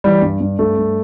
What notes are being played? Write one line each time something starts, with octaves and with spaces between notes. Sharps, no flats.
E3 G3
G2
G2
G2 A3
G2